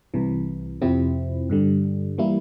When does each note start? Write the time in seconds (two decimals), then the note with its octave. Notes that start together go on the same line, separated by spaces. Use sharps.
0.14 C2 C3 E3
0.81 F2 C3 F3 C4 E4
1.49 G2 D3 G3
2.18 E3 G3 A#3 E4